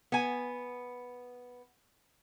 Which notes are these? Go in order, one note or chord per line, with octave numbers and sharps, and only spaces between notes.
B3 G#5